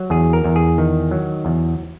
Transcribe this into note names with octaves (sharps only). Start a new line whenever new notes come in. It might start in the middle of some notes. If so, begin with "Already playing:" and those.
Already playing: F#3
E2 G#4
A#4
E2
G#4
D#3
F#3
E2